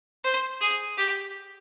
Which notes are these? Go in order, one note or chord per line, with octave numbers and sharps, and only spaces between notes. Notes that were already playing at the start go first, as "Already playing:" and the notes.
C5
G#4
G4